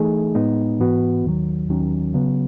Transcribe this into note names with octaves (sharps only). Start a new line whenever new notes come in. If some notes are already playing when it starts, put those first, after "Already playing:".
Already playing: E3 A3 D#4 G#4
A2 G#3 B3 D#4
G#2 E3 B3 F#4
D#2 D#3 F#3
D#2 D#3 F#3 C#4
C#3 F#3 B3